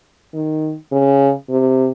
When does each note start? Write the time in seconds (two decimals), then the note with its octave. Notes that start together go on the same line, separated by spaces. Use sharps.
0.34 D#3
0.92 C#3
1.49 C3